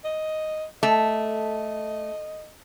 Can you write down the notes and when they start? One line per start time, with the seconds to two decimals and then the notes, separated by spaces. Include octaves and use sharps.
0.04 D#5
0.83 A3 D#5